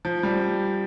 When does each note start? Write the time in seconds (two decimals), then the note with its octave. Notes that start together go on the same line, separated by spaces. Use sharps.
0.05 F3
0.23 G3